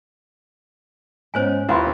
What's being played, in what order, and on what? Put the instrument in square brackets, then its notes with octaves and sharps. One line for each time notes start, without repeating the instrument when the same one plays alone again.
[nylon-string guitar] G#2 B3 C#4 [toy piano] C5 C#5 G#5
[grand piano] D#2 [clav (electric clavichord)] E4 F4 B4 [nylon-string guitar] A5